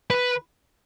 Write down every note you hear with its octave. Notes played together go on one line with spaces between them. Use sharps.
B4